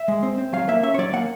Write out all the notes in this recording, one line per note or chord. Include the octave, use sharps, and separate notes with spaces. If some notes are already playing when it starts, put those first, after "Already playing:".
Already playing: E5
G#3
C4
C4
F#3 F5
A#3 E5
C#4 E5
C#5
F#3 D5
A#3 F#5